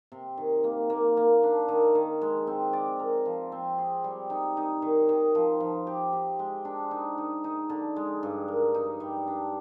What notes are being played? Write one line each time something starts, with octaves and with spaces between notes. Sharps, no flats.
C3
D#3
A#3
A#3
A#3
D4
D#3
D#3
G#3
C4
D5
A#4
F3
C4
G#4
G3
D#4
D#4
D#3
D#3
F3
F3
G4
G4
G#3
D4
D#4
D#4
D#4
D3
G#3
G2
A#4
D#4
G3
D4